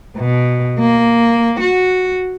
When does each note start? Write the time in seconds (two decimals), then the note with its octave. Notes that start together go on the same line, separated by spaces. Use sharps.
0.17 B2
0.79 A#3
1.60 F#4